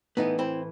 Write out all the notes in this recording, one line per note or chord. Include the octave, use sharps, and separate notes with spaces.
A2 E3 B3 D#4
C4 E4